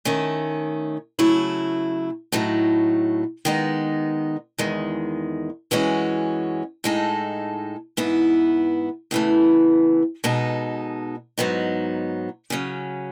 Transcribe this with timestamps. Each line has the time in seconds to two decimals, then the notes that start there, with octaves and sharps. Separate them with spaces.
0.05 D#3 A3 C#4
1.19 C#3 F#3 A3 E4
2.32 A2 F#3 A3 D#4
3.45 D#3 G#3 B3 D#4
4.58 E2 D#3 G#3
5.71 F#2 E3 G#3 C#4 F#4
6.84 A2 G#3 D#4 A4
7.97 G#2 E3 B3 E4
9.11 E2 C#3 E3 A3
10.24 B2 G#3 D#4 A4
11.38 G#2 F#3 B3 D#4
12.50 C#3 F#3 C#4